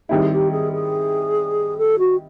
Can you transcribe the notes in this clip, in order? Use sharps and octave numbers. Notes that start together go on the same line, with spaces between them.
D#3 G3 C4 E4 G#4
G4
G#4
G#4
A4
F#4